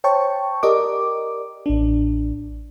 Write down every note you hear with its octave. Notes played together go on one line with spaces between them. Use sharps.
C5 C#5 G5 A5 C#6
G4 A#4 D5 D#5 D6
A1 D4